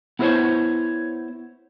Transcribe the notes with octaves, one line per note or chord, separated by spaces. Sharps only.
B3 E4 G#4 A#4 C5 C#5